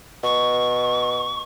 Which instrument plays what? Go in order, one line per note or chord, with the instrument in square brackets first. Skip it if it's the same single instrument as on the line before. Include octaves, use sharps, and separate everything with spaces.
[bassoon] B2 [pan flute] C#6